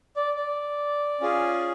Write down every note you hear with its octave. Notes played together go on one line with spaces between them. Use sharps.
D5
D5
C#4 F4 G#4